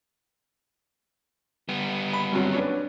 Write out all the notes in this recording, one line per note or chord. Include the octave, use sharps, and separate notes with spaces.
G3 B3
B5
G2 C3 F#3
C#4 D4 B4